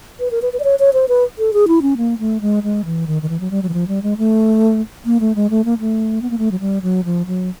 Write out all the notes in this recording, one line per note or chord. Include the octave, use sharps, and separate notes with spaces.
B4
A#4
B4
B4
D5
C#5
C#5
C5
B4
A4
G#4
E4
C#4
A#3
A3
G#3
G#3
E3
D#3
D#3
E3
F#3
G3
F#3
E3
F3
G3
G#3
A3
A#3
A3
G#3
A3
A#3
A3
B3
A#3
A3
F#3
G3
F#3
F3
F#3